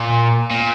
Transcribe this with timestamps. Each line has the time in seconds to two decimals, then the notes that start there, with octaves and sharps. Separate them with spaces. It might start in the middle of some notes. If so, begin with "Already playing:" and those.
Already playing: A#2
0.50 A#2